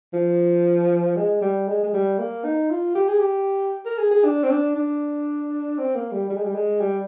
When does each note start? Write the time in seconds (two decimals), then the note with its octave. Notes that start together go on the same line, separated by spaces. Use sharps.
0.13 F3
1.16 G#3
1.42 G3
1.68 G#3
1.83 G#3
1.94 G3
2.19 A#3
2.44 D#4
2.70 F4
2.95 G4
3.08 G#4
3.19 G4
3.86 A#4
3.98 G#4
4.11 G#4
4.24 D4
4.43 C4
4.51 D4
4.76 D4
5.78 C4
5.95 A#3
6.12 G3
6.30 G3
6.36 G#3
6.45 G3
6.55 G#3
6.81 G3